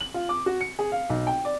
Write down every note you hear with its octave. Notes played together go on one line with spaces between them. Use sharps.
F#7
F4
D6
F#4
C#7
G#4
F5
B1
G5
D5